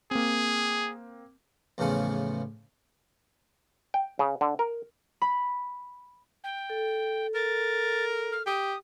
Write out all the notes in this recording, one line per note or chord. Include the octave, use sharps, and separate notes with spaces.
A#3 C4 G#4
E2 A2 C#3 F3 C#4
G5
C#3
D3
A#4
B5
G5
A4
A#4 A6
F6
G4 D#6